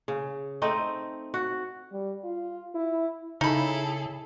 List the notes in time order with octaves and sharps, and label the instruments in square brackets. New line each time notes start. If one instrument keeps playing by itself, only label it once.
[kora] C#3
A3 C4 D#4 D#5
F#4
[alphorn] G3
F4
E4
[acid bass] C#3 [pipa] D#4 B5 [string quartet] E4 G#4 A4